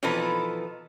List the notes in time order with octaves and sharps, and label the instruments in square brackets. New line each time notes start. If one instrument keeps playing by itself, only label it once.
[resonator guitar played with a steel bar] B2 E3 F3 D#4 A4 B4